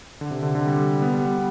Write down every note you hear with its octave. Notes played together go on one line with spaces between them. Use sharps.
D3
C3
D3
D3
G3
B3
G3
B3